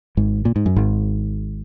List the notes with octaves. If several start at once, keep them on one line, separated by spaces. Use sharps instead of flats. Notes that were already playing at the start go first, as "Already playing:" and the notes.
G#1 G#2
A#2
G#2
F#2
G#1 G#2